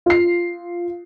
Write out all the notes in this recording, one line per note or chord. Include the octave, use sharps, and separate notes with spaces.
F4 C7